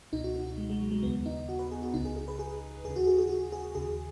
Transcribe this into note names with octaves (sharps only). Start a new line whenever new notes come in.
C#2 B2 D#4
F#4
F#4
D#4
G#3
G#3
F#3
G#3
D#2 C#3 B3
D#4
F#4
B4
G#4
F#4
C#2 C#3 D#4
G#4
G#4
B4
G#4
D#2 C#3 G#4
F#4
G#4
G#4
F#4
G#4
D#2 C#3 G#4